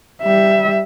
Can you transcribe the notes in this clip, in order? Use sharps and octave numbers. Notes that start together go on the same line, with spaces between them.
G3 E5